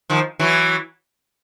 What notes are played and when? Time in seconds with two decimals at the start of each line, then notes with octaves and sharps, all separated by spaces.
0.10 D#3 F3
0.39 E3 F#3